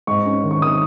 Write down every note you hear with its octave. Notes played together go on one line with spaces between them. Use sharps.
G#2 C#6
C#4
D#3
C#6
D#3 D#6